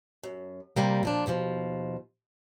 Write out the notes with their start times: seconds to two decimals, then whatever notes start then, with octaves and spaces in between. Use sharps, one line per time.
0.23 F#2
0.76 C3 G3 A#3
1.03 A#2 F3 D4
1.26 D#2 B2 E3 F3